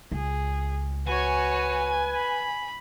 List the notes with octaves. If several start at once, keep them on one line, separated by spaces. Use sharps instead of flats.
C#2 G#4
F#4 B4 C#5 G#5
B5